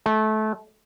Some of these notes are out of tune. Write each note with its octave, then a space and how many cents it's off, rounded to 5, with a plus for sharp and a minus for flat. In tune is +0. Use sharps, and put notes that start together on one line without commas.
A3 -25